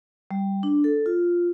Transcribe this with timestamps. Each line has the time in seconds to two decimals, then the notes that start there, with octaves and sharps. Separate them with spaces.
0.31 G3
0.63 D4
0.84 A4
1.06 F4